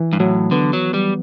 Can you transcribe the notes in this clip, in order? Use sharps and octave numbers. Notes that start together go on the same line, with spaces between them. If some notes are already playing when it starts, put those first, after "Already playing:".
Already playing: E3
G2
A2 F#3
D3 B3
F#3
G3